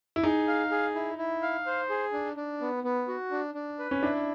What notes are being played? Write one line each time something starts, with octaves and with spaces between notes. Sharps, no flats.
E4
D#4 G#4
F5
G#4
E4
E4
F5
C5
G#4
D4
D4
B3
B3
F#4
D4
D4
B4
C#4
D4 E4